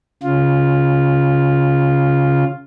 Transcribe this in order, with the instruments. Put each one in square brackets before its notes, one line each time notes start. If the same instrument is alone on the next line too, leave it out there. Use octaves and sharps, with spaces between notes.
[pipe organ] C#3 F4